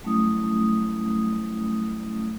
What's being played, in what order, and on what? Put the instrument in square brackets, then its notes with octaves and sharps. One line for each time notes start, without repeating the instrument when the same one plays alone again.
[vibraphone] F#3 G3 A3 C#4 E4 D#6